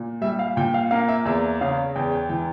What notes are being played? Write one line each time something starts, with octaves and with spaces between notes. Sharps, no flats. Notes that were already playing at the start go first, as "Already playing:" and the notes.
Already playing: A#2
G3 E5
F5
A#2 G5
F5
A#3 F5
E5
E2 E5
C#3 F5
E2 G5
G5
E3 G5